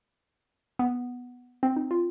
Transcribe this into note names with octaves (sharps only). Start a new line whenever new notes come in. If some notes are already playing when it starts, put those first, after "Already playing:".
B3
C4
D#4
F4